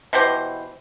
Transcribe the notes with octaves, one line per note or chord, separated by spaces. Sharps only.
B2 E3 G4 C5